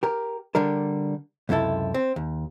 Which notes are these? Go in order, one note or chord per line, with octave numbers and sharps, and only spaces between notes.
G4 A#4
D3 G3 D4 A#4
C#2 F#2 C3 E4 A4
C4
D#2